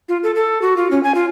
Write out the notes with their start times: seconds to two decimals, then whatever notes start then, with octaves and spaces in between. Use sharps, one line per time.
0.09 F4
0.23 A4
0.35 A4
0.62 F#4
0.77 F4
0.91 C#4
1.03 G#5
1.15 F4